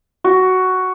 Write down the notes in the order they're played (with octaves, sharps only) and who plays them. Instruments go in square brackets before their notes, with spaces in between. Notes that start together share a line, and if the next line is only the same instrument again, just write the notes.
[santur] F#4